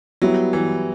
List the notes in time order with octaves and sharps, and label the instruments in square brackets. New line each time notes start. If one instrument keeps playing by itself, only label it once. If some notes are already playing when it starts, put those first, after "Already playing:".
[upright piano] F#3 [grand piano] G3 B3 E4
[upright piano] E3